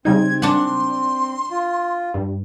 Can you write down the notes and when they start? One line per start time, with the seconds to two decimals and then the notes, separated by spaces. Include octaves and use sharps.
0.05 C#3 G3 C4 D#4 G#6
0.42 D4 F#5 C6
1.51 F4
2.14 G2